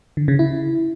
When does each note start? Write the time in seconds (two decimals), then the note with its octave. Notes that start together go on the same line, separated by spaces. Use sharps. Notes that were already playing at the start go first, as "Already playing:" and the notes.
0.17 D3
0.28 C#3
0.39 E4